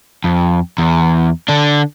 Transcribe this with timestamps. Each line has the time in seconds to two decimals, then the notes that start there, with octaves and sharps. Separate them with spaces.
0.24 F2
0.78 E2
1.48 D3 D4